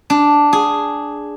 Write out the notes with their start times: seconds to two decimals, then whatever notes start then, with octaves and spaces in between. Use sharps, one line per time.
0.10 D4
0.53 G#4